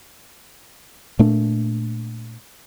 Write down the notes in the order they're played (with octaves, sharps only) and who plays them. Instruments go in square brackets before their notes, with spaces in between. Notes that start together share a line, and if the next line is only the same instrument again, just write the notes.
[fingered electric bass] A#2 A3 D4